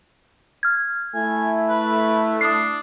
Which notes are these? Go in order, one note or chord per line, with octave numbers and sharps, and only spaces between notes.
F6 G#6
A3 E4 G#5
B4
D4 D#6 C7